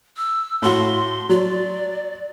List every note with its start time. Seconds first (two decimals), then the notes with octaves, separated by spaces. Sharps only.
0.17 E6
0.62 A2 F#4 C6
1.29 F#3 D5